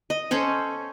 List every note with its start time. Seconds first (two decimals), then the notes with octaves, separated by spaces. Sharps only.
0.10 D#5
0.31 C#4 A4 C5 C#5